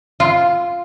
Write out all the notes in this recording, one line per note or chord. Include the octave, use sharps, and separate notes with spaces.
F4